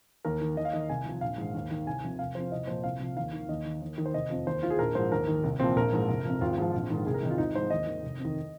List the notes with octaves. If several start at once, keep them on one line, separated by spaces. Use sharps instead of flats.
D#2 A#4
D#3
D#2 D#5
F5
D#3 D#5
C2 G#5
C3 F3
A#1 F5
G#2 D#3
D#2
D#3
C2 G#5
C3 F3
F1 F5
F2 F3 C5
C2 D#5
A#2 F3 C5
C2 F5
C3 F3
D#2 F5
D#3
D#2 D#5
D#3
D#2
D#3
C5
F1 D#5
F2 F3
D#2 C5
D#3 F4
G#4
A#1 A#4
G#2 F3 C5
D#2 A#4
D#3
C2
A#2 F3 C4
A#1 A#4
G#2 F3
F1
F2 F3
G#1 F4
G#2 F3
A#1
G#2 D#3
C2 G#4
A#4
C3 D#3 D#4
F4
G#1 D#4
G#2 F3 C5
D#2 D#5
D#3
F1
F2
D#3